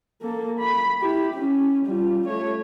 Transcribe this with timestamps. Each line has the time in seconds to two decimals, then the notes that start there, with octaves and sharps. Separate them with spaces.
0.22 A#3 A4
0.60 B5
1.01 E4 G4
1.34 C#4
1.86 G3 F4
2.27 A3 C#5